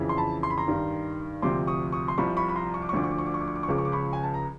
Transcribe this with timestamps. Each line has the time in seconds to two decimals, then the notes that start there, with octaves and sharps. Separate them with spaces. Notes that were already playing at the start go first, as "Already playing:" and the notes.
Already playing: F2 C#3 E3
0.09 C6
0.17 A5 B5
0.43 C6
0.50 B5
0.58 A#5 C6
0.68 G2 D#3
1.42 D2 C3 F3 C6 D6
1.67 C#6 D#6
1.92 C#6 D#6
2.08 C6
2.18 C2 C3 F3 B5 C#6
2.37 B5 C#6
2.49 B5
2.56 A#5 C6
2.74 C#6
2.82 D6
2.89 C#6
2.93 D2 D3 F3 D6
3.04 C#6
3.11 D6
3.18 C#6
3.26 D6
3.34 C#6
3.41 D6
3.48 C#6
3.55 D6
3.63 C#6
3.68 C#2 C#3 F3 D6
3.78 C#6
3.85 D6
3.92 B5 C#6
4.13 G#5
4.23 A5
4.34 A#5